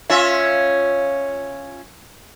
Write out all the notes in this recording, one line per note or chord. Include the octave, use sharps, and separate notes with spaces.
C#4 F4 E5